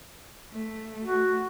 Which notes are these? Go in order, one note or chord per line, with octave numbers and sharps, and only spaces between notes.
A3
F#4